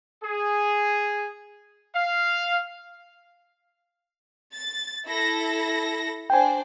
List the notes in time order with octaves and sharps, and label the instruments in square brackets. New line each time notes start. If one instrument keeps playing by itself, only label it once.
[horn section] G#4
F5
[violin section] A6
E4 A4 A#6
[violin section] D4 C5 [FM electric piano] G5 G#5